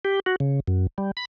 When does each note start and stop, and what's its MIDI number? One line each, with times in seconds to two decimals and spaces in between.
0.05 0.20 67
0.26 0.36 66
0.40 0.60 49
0.67 0.87 42
0.98 1.11 55
1.17 1.25 83